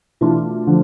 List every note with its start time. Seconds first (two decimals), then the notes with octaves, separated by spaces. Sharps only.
0.21 B2 E3 A3 D4 F4
0.67 D3 F3